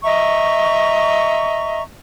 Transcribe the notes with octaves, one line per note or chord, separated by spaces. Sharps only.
D#5 E5 A#5 C#6